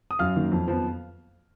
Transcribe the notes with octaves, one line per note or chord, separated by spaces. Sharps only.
D#6
F#2 F5 F6
D#3 A#3
F2
F3 B3